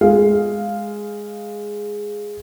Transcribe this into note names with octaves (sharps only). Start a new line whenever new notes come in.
G#3 F5